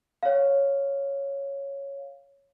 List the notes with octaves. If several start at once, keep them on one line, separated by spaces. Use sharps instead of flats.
C#5 F5